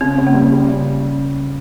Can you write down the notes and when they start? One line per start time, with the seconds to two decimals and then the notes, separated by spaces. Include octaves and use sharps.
0.01 C#3 C4
0.18 C#3
0.27 A#3
0.34 G3
0.52 C#3
0.69 C#3